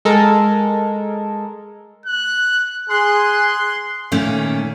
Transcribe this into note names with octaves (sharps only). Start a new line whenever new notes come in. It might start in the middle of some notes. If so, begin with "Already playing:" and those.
G#3 A4 A#4
F#6
G#4 C6 F#6
A#2 D#3 A3 C#4